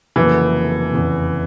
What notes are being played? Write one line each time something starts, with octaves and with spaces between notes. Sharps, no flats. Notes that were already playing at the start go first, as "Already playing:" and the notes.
F1 F2 C#3 E3 F#3 A#3
F1 E2 C#3